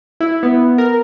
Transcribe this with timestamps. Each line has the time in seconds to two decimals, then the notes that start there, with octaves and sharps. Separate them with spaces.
0.20 E4
0.43 B3
0.78 A#4